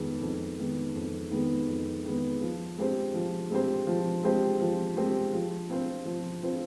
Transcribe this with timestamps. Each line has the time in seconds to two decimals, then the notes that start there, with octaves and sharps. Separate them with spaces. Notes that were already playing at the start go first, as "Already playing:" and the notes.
Already playing: F2 D#3 G#3 B3
0.21 F2
0.59 D#3 G#3 B3
0.95 F2
1.31 D#3 G#3 B3
1.69 F2
2.04 D#3 G#3 B3
2.41 F3
2.78 G#3 C4 G4 C5
3.14 F3
3.50 G#3 C4 G4 C5
3.87 F3
4.23 G#3 C4 G4 C5
4.60 F3
4.97 G#3 C4 G4 C5
5.33 F3
5.70 C4 F4 C5
6.05 F3
6.42 C4 F4 C5